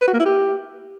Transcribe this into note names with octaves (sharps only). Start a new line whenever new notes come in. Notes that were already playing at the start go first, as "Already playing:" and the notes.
B4
F#4
A#3
E4
G4